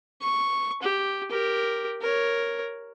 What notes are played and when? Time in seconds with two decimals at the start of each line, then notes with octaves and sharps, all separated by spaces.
0.22 C#6
0.83 G4
1.31 G4 A#4
2.02 A#4 C#5